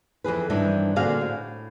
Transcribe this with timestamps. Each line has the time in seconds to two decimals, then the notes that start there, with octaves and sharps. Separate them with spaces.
0.24 F2 E3 G#4 B4
0.50 G2 D#3 E3 C4 D4
0.96 A#2 D3 C4 F#4 G#4 F5
1.21 A2